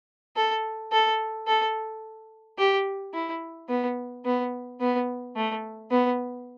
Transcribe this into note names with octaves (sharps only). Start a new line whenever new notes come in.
A4
A4
A4
G4
E4
B3
B3
B3
A3
B3